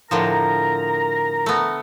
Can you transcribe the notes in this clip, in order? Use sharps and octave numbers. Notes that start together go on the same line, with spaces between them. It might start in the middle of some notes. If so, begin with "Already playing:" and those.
A2 D3 F3 A#4 A#5
A3 B3